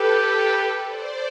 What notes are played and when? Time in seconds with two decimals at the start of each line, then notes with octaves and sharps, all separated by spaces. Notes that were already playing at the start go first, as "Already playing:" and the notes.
Already playing: G4 A4 B4
0.88 C5 D5